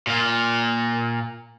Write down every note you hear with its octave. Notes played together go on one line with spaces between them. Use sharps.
A#2 F4